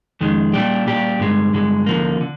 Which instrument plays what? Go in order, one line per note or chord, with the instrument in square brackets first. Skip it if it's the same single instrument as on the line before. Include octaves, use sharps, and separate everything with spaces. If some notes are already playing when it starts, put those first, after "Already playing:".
[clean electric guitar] F2 D#3 G#3
A#2 G3 D4 G4
A#2 G3 D4 G4
G2 D3 G#3
G2 D3 G#3
D2 D3 F3 A#3
D3